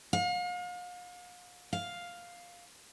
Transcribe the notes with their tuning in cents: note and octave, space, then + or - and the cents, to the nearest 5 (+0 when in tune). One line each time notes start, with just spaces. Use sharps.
F5 +40
F5 +5